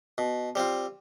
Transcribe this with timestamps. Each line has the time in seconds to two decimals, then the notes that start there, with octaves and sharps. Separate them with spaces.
0.18 B2
0.55 G3 C4 F4